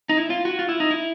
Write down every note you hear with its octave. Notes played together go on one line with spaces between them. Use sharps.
D#4
E4
F4
F#4
F4
E4
D#4
E4